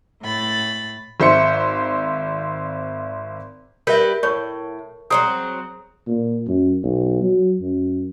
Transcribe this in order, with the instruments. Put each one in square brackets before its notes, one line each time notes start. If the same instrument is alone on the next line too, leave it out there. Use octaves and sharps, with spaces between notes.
[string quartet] A2 B5 A6
[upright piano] G#1 C5 E5 C#7
[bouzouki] G3 G4 B4 [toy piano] A#4 E5
[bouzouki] A2 [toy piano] C#5 C#6
[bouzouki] F#3 G3 C4 [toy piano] G#4 A#5 D#6
[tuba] A#2
F#2
B1
F#3
F#2